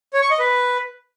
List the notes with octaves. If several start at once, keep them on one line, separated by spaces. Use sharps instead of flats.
C#5
C#6
D#5
B4